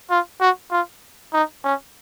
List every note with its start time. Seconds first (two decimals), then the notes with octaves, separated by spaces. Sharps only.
0.10 F4
0.41 F#4
0.72 F4
1.33 D#4
1.65 C#4